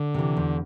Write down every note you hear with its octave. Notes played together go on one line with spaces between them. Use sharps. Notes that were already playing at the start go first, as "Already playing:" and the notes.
Already playing: D3
C3 E3
E2